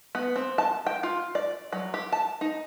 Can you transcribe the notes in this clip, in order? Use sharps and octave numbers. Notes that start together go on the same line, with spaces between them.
B3
C4
A5
G5
F4
D5
F#3
G4
A5
D#4